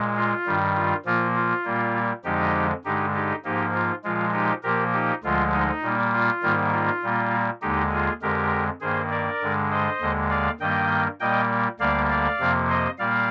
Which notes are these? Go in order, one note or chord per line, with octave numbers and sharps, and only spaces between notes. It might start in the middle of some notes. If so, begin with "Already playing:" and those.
Already playing: A#2 G#3
F4
G2 D#3 G3
F4
A#2 F3 A#3 F4
F4
A#2 G3 A#3
F2 D3 F3 G#3 D#4 G4
G2 D3 G#3 D#4 G4
D#4 G4
G#2 F3 A#3 D#4 G4
F4
A#2 F3 G#3 F4
D#4 G4
A#2 F3 A#3 G4 A#4
D#4 G4
D2 D3 F3 G#3 F4
D#4
A#2 G3 A#3
F4
G#2 D#3 G3 A#3
F4
A#2 G3 A#3
D#2 D3 G#3 D#4 G4
F4 G#4
F2 D3 G#3 G4 A#4
G2 D#3 A#3 G#4 C5
A#4 D5
G2 D3 G#3
C5 D#5
D#2 D3 G#3
D5 F5
G2 D#3 G3 A#3 D#5 G5
A#2 G3 A#3 D#5 G5
D2 D3 G3 A#3 D5 F5
D5 F5
F2 C3 F3 A#3
C5 D#5
A#2 G3 A#3 D5 F5